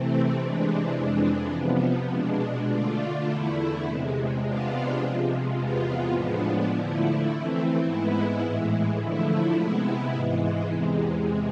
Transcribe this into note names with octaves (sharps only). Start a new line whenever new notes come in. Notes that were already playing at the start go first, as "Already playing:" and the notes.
Already playing: C3 E3 A3 C4
C3 E3 G#3 D4
F2 E3 G#3 D4
C3 F3 B3
B2 G#3 D4
D3 A3 D4 F4
E2 D3 A3 E4
E2 C3 G#3
C3 G#3 B3 D4 F4
C3 F3 G#3
E2 C3 G#3 B3 F4
A2 F3 G#3 B3 D4
D3 F3 A3 E4
E3 A3 C4
G#2 G#3 B3 E4
A2 E3 G#3
D3 F3 A3 E4
C3 G#3 B3 E4
G#2 E3 G#3
E2 C3 G#3